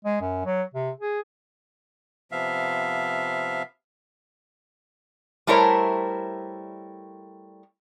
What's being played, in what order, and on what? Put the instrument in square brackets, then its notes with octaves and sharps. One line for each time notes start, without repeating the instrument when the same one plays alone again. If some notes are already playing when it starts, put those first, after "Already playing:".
[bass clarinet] G#3
F#2
F#3
C3
G#4
[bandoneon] C3 F3 B3 E5 F5
[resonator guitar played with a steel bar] G3 A3 E4 A#4 C5 C#5